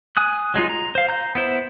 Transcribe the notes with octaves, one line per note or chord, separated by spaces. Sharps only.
G#5 D#6 F#6
F#3 G#3 D#4 F4
A#5
C5 F5
A#5 G6
B3 E4 C5